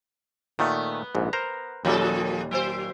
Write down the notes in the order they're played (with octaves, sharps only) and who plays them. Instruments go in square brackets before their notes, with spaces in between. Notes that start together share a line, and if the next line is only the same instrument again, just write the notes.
[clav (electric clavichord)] A#2 D#3 A3 [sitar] B3
[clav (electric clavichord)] A#1 G#2
A#4 C5 A#5
[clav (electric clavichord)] D#2 A#2 G3 [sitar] F3 C#4 A4
[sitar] F#3 C5